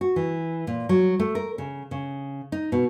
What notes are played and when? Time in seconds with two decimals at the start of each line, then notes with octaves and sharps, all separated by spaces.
0.01 F#4
0.16 E3
0.67 A#2
0.89 F#3
1.20 A3
1.35 A#4
1.58 C#3
1.91 C#3
2.52 D#4
2.72 B2